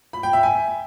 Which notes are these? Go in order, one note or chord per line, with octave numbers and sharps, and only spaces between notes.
B5
G5
E5
G#5